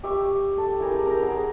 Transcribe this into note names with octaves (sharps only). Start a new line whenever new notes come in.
G4 E5 C#6
A4
E4 G4 G#4 A#4
A#4 G5 A#5
G#4 F#5